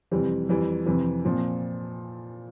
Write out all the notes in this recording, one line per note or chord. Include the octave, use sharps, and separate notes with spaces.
F2 C3 E3 G3 C4
F2 E3 G3
F2 C3 E3
A#2 F3 C4